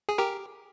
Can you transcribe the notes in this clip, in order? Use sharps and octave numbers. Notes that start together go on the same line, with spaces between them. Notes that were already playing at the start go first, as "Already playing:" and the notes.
G#4
G4 A#4